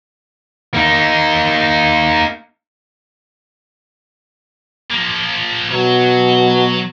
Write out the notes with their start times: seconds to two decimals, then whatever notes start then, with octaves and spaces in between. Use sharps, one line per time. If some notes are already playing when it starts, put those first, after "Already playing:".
0.74 A#3 D#4
4.91 F3 A#3
5.71 B2 F#3